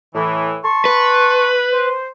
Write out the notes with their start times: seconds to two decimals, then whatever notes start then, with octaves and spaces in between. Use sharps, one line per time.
0.14 A2 E3
0.64 A5 C6 C#6
0.85 B4
1.72 C5